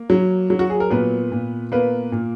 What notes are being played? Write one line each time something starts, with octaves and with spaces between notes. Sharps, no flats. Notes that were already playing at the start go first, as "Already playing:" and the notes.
Already playing: A#3
F#3
F#3
F#4
G#4
A#4
A#2 B3 B4
A#2
A#3 B3 B4
A#2